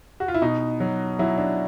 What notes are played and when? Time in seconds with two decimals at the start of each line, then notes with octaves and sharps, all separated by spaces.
0.20 F#4
0.28 F4
0.34 E4
0.42 B2 D#4
0.80 F#3
1.19 F#3 E4
1.38 D4